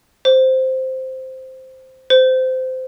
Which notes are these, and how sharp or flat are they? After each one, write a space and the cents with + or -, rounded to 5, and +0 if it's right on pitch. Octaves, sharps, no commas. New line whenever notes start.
C5 -5
C5 -20